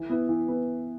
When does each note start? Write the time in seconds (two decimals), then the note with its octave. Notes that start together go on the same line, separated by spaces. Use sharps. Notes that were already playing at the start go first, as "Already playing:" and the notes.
Already playing: E3
0.09 B3 E4 B4
0.29 E3
0.48 B3 E4 B4